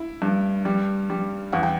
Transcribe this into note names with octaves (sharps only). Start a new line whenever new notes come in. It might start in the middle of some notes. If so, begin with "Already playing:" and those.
Already playing: E4
G2
G3
G3
E2 F#5
G5